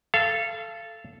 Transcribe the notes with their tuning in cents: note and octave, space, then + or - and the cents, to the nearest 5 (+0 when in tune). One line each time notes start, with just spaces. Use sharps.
A4 -5 F5 -30